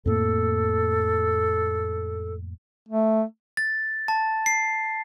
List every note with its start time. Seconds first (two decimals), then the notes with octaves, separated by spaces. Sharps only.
0.06 F2 A2 A#3 A4
2.89 A3
3.57 A6
4.08 A5
4.46 C7